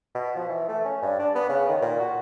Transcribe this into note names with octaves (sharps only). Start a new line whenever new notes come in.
B2
F3
E3
A3
C#4
G2
D4
B3
C#3
D#3
A#2
F#4